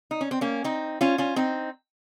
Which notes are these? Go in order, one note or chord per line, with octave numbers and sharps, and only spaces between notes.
D#4
C#4
C4
A#3 C#4
C4 D#4
C#4 F4
C#4 F4
C4 D#4